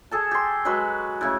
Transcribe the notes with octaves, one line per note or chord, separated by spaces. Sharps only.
G#4 A4 A5
G4 C6
F#3 G#3 F#4 B4
A2 C#3